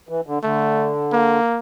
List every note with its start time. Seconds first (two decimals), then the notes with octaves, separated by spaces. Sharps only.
0.09 E3
0.27 D3
0.43 D3 A3
1.13 A#3